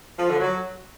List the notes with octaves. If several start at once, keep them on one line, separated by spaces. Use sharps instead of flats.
F3
D3
F#3